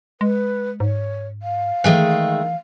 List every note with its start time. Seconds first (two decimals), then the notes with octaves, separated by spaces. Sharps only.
0.21 G#3 B4
0.80 G#2 C#5
1.42 F5
1.84 D#3 E3 G#3 A3